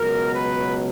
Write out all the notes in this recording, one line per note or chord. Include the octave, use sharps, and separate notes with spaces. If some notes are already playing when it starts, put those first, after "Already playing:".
Already playing: C#2 B2 F#3 A#4
B4